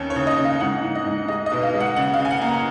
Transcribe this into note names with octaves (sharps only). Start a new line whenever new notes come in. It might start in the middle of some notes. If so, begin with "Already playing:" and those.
Already playing: D#2 C#4
C#5
C#3
D#5
C#3
F5
G#2 F#5
G#2
D#5
G#2
G#3 D#5
D#5
B2
F5
G#3
F#5
C#3 F#5
F5
C#3
G#5
F#5
A#3
A#5